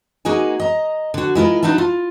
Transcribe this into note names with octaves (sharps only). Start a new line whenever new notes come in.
A#3 D#4 F#4 G#4 G#5
D#5 A#5
D3 F#4
G#3 E4 F4 A#4
D4 D#4 F#4 E5 A5
F4